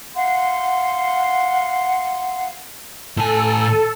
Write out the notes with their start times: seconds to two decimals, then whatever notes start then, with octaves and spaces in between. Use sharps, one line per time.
0.15 F5 F#5 C6
3.17 A2 A4 G#5